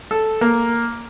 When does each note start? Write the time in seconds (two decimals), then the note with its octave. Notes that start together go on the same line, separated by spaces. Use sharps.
0.11 A4
0.41 A#3